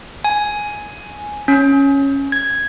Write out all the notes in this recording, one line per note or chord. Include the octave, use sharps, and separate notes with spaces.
G#5
C#4
G#6